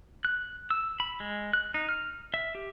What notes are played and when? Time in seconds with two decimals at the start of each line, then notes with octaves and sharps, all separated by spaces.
0.25 F#6
0.70 E6
1.00 B5
1.20 G#3
1.53 F#6
1.74 D#4
1.89 F6
2.34 E5
2.55 G4